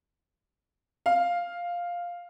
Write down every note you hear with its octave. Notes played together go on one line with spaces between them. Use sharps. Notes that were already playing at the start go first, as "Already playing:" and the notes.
F5